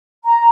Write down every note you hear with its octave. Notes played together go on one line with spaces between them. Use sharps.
A#5